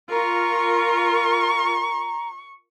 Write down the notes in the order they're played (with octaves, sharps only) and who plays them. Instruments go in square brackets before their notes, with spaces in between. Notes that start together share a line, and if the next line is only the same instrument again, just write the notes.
[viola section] F4 A#4 [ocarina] A#5 [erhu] C#6